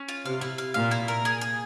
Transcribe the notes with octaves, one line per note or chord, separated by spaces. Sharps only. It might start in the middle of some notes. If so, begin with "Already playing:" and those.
Already playing: C#4
F4
C3 F5
E4
F5
A#2 F5
E4
A#4
G#4
G#4